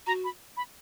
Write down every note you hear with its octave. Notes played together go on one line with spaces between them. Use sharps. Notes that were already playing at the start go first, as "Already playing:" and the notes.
F#4 A#5
B5
B5